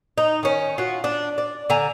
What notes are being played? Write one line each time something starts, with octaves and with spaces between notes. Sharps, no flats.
D#4
D#3 C#4
F4 F#4
D4
D5
D3 G#5 A#5